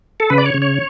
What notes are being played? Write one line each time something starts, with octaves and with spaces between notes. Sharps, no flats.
A4
C#3 B4
D5
C#5
C#3
C#5